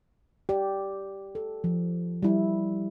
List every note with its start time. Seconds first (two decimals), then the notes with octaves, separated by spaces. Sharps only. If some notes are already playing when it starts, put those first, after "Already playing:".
0.49 G4 D5
1.35 A4
1.64 F3
2.23 G3 E4